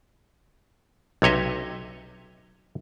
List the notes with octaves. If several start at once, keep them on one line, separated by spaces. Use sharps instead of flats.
B1 C3 C#5 D#5 E5